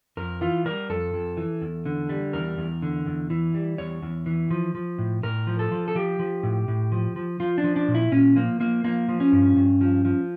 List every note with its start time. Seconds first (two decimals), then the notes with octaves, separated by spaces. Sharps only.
0.17 F2 A#4
0.41 E3 F4
0.65 G3 A#4
0.90 F2 A4
1.13 F2
1.37 E3
1.62 E2
1.86 D3
2.09 G3
2.33 E2 A#4
2.58 E2
2.82 D3
3.06 E2
3.30 E3
3.54 G3
3.78 E2 C#5
4.02 E2
4.26 E3
4.51 F3
4.75 F3
4.98 A2
5.23 A2 A#4
5.47 F3
5.59 A4
5.71 F3
5.88 A4
5.95 F3 G4
6.19 F3
6.43 A2
6.68 A2
6.92 F3
7.16 F3
7.40 F3 F4
7.58 D4
7.64 F3
7.76 D4
7.88 A#2
7.95 E4
8.12 A#2 C#4
8.36 F3 A#3
8.60 F3 A#3
8.84 F3 A#3
9.08 F3
9.20 C#4
9.32 G2
9.56 G2
9.81 F3
10.05 F3